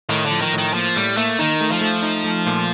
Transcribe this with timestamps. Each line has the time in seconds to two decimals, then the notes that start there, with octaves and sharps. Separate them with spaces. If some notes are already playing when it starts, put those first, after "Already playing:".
0.09 A2 D#3
0.26 D3 F3
0.42 D#3
0.53 A2
0.58 D#3
0.74 F3 A#3
0.96 A2 G3
1.17 A3 A#3
1.39 D#3 D#4
1.61 A3
1.71 F3
1.81 A3
2.02 D#4
2.24 A3
2.46 A#2